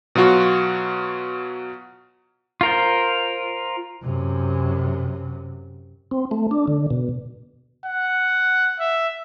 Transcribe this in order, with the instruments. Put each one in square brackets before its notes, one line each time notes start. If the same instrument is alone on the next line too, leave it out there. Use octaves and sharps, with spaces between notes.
[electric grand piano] B2 F#3 F4 F#4
[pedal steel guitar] F4 A#4 C5
[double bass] F#2 C3
[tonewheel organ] C4
A3
D4
D3
B2
[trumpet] F#5
E5